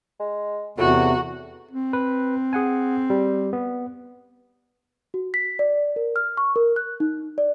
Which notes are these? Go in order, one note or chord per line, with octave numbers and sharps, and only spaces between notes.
G#3
E2 A2 C3 F#4
C4
B4
G#4 F#5 G#5
G3
B3
F#4
B6
D5
A#4
F6
C#6
A#4
F#6
D#4
D5